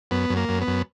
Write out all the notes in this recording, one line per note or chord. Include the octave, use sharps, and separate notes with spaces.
F#2 B3
F#2
A#3
F#2
B3
F#2